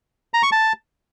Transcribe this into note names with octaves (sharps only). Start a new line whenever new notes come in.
A#5
C#6
A5